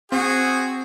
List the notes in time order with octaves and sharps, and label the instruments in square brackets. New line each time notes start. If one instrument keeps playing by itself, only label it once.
[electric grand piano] C4 [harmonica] F#4 G#4